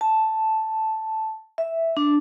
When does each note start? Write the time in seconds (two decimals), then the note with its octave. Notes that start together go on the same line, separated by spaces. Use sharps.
0.01 A5
1.58 E5
1.97 D4